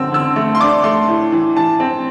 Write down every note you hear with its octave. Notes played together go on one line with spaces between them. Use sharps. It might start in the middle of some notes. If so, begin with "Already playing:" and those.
Already playing: D3 C4 E6
D3 E6
A3
C6
D4 D6
A3 C6
A2
E3
E3 A5
C4